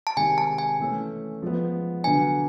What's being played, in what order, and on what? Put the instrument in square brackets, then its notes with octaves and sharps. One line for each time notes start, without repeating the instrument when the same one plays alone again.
[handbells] A5
[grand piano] C3 D#3 G#3 [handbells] G#5
[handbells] A5
G#5
[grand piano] E3 A3 C#4
F3 G#3 B3
[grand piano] D3 F#3 B3 D4 [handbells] G#5